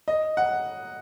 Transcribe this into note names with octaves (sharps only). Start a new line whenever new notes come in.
D#5
F#5